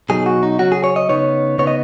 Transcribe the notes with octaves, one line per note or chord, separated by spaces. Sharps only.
B2 F#3 D#4 G#4
F#4
D#4
C#3 F#3 C#4 F#4
G#4
C#5
D#5
C#3 B3 D#4 C#5
C#3 B3 D#4 C#5
D#5